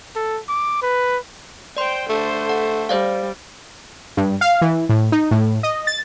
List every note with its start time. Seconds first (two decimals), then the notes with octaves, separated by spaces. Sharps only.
0.15 A4
0.49 D6
0.82 B4
1.77 C5 D5 G5 C6
2.09 D3 A3 C5
2.49 F#5
2.89 G3 C5 D5 F5
4.17 G2
4.41 F5
4.62 E3
4.89 A2
5.12 D#4
5.31 A2
5.63 D#5
5.87 A6